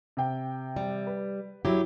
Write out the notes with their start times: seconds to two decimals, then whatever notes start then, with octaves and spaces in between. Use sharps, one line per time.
0.17 C3 G5
0.76 G3
1.07 B4
1.65 F#3 E4 G4